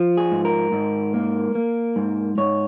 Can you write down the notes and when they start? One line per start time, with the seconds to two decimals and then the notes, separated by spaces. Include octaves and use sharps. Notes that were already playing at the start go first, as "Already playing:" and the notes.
Already playing: F3
0.17 G#4
0.32 G#2
0.45 A#4
0.72 G#2
1.14 A#3
1.55 A#3
1.96 G#2
2.38 G#2 C#5